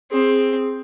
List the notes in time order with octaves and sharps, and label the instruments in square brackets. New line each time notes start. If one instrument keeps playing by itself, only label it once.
[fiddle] C4 [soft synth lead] G#4